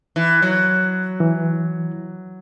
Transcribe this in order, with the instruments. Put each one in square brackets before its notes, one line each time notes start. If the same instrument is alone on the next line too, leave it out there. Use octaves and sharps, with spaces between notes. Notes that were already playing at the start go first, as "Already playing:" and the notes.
[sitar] E3
F#3
[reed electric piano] E3